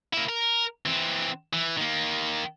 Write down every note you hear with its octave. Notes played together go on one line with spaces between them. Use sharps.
A#3 E4
A#4
E3 C4
E3
D#3 A#3